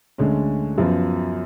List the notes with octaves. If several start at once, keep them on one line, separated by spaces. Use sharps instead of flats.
D2 D3 G#3 C#4
F#2 F3 B3